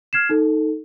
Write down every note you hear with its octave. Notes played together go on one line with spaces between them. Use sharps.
F6 G#6 C7 E7
D#4 A4